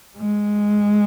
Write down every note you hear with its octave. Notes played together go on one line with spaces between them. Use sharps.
G#3